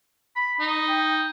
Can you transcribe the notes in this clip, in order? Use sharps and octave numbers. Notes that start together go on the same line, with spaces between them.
B5
D#4
G5